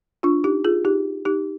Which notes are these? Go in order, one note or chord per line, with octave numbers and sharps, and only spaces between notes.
D4 F4
D#4 G4
F4 G#4
D#4 G4
D#4 G4